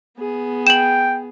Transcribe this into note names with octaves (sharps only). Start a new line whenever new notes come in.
B3 G#4
G5 E7 F#7